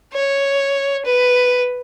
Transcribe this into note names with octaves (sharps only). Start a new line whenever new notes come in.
C#5
B4